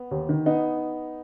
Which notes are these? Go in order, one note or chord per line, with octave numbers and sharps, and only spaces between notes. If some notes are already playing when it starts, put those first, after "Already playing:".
Already playing: B3
D#2
D#3
B3 D#4